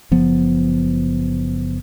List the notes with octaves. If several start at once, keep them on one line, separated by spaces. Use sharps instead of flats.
F#1 F3 B3